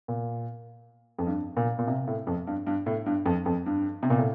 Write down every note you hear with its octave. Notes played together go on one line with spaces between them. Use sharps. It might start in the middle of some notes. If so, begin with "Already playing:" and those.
A#2
F2
G2
A#2
A#2
C3
A2
F2
G2
G2
A2
G2
F2
F2
G2
C3
A#2
A2